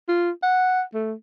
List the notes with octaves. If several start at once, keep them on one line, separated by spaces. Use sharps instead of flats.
F4
F#5
A3